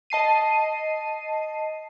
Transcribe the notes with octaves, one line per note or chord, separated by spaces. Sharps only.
D#5 A5 C7 D#7